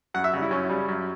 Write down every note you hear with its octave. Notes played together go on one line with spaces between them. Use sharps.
F#2 F#5
E5
C#3 G3
E4
F#2 C#4
C#3 G3
F#2